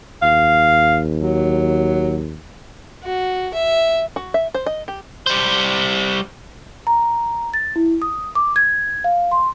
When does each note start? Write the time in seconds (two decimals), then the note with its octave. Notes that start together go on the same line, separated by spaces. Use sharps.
0.22 D#2 F5
1.22 F#3
3.04 F#4
3.54 E5
4.16 F#4
4.34 E5
4.54 C5
4.66 D#5
4.88 G4
5.27 G3 C5
6.87 A#5
7.54 A6
7.76 E4
8.02 D#6
8.35 D6
8.56 G#6
9.04 F5
9.31 C6